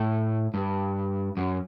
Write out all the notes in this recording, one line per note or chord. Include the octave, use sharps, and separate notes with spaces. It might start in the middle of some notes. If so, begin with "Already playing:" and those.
Already playing: A2
G2
F#2